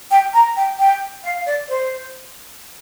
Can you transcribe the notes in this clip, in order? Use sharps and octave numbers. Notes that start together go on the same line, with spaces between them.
G5
A#5
G5
G5
F5
D5
C5